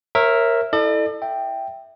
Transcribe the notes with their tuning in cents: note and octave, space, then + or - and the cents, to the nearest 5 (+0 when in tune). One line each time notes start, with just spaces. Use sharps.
A#4 +0 C#5 -30 E5 +0
E4 -15 A4 +0 D5 +45
E5 +0 G5 +0